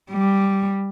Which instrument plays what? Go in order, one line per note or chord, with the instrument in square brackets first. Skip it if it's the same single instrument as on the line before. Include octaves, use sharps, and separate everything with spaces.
[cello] G3